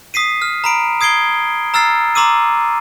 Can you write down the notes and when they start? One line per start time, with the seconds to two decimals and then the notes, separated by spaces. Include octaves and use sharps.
0.14 D#6 B6 C7 D#7
0.42 F6
0.64 A#5 B5 D7
1.01 D#6 G#6 C7 D7 G7
1.74 A#5 E6 F6 A6 C7
2.15 A#5 C6 D6 E6 D#7